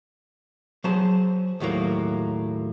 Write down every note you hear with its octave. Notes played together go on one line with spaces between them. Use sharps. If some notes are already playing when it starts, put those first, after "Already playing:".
F#3 G#4 C5 A5
D#2 A2 F#3 A#3